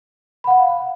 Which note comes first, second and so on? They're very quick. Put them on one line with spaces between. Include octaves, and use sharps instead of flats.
B5 F#5 F5